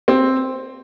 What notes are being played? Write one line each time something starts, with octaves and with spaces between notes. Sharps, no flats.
C4